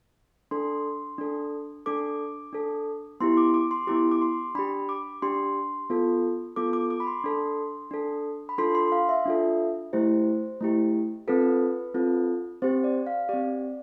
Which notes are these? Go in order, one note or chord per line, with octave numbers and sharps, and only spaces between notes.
D4 A4 C6
D4 A4
D4 A4 D6
D4 A4
B3 E4 G4 C6
D6
D6
C6
B3 E4 G4 D6
D6
C6
D4 G4 B5
D6
D4 G4 C6
B3 F4 A4
B3 F4 A4 D6
D6
D6
B5
C6
D4 A4
D4 A4
B5
D4 F4 A4 C6
C6
F5
E5
D4 F4 A4
A3 E4 G4 C5
A3 E4 G4
C4 F4 A4 B4
C4 F4 A4
C4 G4 C5
D5
F5
C4 G4 D5